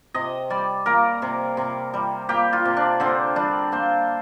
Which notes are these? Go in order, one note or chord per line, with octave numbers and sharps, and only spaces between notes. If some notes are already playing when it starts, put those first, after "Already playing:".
C3 D#5
G3 D5
A#3 A#4
C3
C3
G3
A#3 G4
F4
C3
D4
D3 C4
G3 D4
A#3 C5